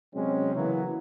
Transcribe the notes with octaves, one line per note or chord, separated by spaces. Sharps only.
C3 F#3 G#3 C4 C#4
C#3 E3 F#3 A#3 B3 E4